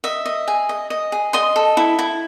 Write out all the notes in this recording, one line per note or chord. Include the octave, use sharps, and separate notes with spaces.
D#5 E5
D#5
G#4
D#5
D#5
G#4
D#5 C6 D#6
A4
E4
E4